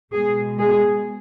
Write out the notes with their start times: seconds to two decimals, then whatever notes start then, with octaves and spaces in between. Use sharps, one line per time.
0.14 B2 G#3 G#4
0.59 G#4